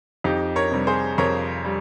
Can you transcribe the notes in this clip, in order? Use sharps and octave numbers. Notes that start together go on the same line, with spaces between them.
F2 D#4 G4
A#4 C#5
C3 G3
G#4 C5
F2 A#4 C#5
G3